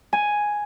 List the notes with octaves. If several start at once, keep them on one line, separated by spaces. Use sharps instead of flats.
G#5